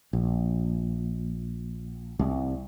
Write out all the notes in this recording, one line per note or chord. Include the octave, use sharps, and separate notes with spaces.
A#1
C2